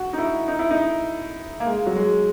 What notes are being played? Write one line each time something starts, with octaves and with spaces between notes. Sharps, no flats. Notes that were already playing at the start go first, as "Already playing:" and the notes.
Already playing: F#4
D#4
E4
D#4
E4
D#4
A#3
G#3
F#3
G#3